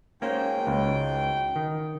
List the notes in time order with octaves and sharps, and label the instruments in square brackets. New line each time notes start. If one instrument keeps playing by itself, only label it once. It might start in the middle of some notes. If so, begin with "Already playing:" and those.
[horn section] G#2 F#4 G5 [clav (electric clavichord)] A#3 C#4 C5
[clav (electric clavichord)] C#2
D#3